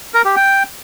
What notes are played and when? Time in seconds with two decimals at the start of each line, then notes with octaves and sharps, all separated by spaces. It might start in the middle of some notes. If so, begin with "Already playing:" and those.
0.14 A#4
0.25 G4
0.36 G5